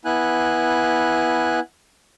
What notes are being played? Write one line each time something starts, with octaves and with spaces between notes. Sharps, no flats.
B3 E4 G#5 F#6